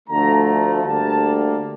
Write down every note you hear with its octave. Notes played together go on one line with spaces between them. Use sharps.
D2 D3 F3 A3 A#5
A#5
D2 D3 G3 A#3 A5